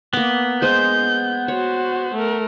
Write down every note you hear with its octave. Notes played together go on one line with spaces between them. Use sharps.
A#3 B3 D6
G#3 C5 G#5 G6
F#4 C5 C#5
A3 A#4